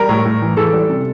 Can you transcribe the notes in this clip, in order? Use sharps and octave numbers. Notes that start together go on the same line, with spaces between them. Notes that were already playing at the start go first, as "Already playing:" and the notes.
Already playing: G3 A#4
A2
A2
E3
E3 A4
G3
C3